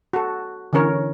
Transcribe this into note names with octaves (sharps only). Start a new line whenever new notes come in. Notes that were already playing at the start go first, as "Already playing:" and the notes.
F#4 A4
D3 E3 C#4 A#4 C#5